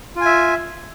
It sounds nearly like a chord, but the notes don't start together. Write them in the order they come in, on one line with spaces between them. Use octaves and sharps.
F4 G#5 E5